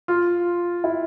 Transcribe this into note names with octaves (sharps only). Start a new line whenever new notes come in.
F4
E4